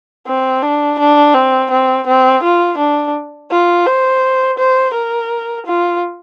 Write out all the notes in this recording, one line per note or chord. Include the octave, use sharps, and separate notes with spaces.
C4
D4
D4
C4
C4
C4
F4
D4
F4
C5
C5
A#4
F4